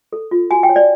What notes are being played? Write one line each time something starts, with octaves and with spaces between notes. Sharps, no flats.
A4
F4
F#4 G#5
G5
C#5
D5